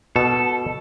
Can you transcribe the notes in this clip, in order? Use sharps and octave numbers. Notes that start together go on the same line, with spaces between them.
B2 A4